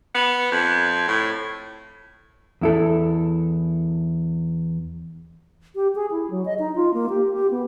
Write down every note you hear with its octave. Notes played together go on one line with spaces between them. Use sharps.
B3
F2
A2
E2 E4 A4
G4
G#4
E4
F#3
D#5
D#4
F4
A#3
G4
G4
B3